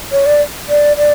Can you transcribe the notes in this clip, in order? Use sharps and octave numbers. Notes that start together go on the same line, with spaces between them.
C#5
D5
D5
D5